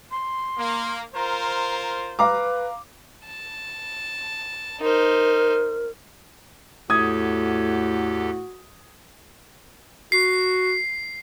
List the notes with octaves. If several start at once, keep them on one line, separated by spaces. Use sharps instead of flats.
C6
A#3
F4 A#4 C5 A#5
B4 F5 A#5 D6
A5
D#4 A#4 C5
E2 A2 F#4 G4 A4 D#6 G#6
F#4 C7